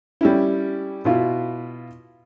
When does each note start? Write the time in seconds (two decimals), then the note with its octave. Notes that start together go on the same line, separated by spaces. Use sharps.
0.21 G3 C#4 E4
1.05 B2 E4 F4